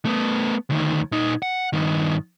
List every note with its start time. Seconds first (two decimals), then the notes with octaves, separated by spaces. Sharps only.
0.05 A3 B3
0.70 D2 D#3
1.12 A#2 D#4
1.42 F#5
1.73 G2 D#3